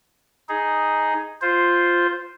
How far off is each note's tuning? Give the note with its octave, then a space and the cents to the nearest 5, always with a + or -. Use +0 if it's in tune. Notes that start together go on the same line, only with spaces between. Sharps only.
D#4 +0 G#4 +0
F4 +0 C5 +0